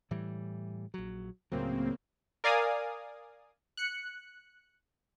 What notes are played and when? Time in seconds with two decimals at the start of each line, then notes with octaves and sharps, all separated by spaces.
0.11 A2 E3 G3
0.94 A#1 F#3
1.52 C#2 A2 C#3 F#3 A#3 C4
2.44 A#4 D5 F5 G#5 D#6
3.77 F#6 C#7